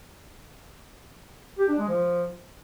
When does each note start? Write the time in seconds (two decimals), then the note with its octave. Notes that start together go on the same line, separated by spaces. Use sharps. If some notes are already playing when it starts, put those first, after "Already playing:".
1.58 G4
1.68 D4
1.78 G#3
1.88 F3